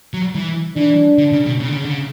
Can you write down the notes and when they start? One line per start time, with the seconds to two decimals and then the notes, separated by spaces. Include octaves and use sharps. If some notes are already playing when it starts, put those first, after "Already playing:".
0.14 F#3
0.35 E3
0.76 E3 D4
1.18 D3
1.32 C#3
1.46 B2
1.59 C#3
1.68 D3
1.76 C#3
1.85 D3
1.92 C#3